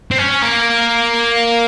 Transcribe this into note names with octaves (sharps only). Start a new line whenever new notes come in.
C4
C#4
A#3